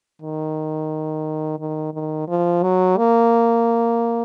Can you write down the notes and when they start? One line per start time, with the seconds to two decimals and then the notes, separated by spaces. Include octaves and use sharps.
0.22 D#3
1.59 D#3
1.94 D#3
2.28 F3
2.63 F#3
2.97 A#3